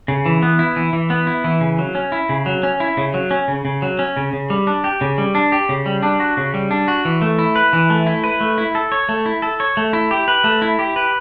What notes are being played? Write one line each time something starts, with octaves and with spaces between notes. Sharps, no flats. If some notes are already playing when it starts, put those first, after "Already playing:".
C#3
E3
B3
E4
E3
E3
B3
E4
E3
C#3
F#3
C#4
E4
C#3
F#3
C#4
E4
C#3
F#3
C#4
C#3
C#3
F#3
C#4
C#3
C#3
G3
D4
G4
C#3
G3
D4
G4
C#3
G3
D4
F#4
C#3
G3
D4
F#4
E3
A3
E4
B4
E3
A3
E4
B4
A3
E4
A4
C#5
A3
E4
A4
C#5
A3
E4
G4
B4
A3
E4
G4
B4